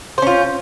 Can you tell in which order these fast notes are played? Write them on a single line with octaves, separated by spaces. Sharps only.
C5 C#4 F4